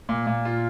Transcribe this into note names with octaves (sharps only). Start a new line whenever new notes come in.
A#2
A#2
F4